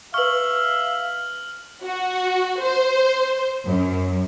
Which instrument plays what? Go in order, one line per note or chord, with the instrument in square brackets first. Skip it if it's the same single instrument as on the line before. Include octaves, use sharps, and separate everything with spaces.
[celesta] B4 C#6 [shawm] E5 [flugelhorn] F5 [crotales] F6 F#7
[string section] F#4
C5
F#2